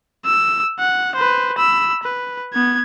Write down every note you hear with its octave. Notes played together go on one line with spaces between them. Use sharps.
E6
F#5
B4 C5
B5 E6
B4
B3 G#6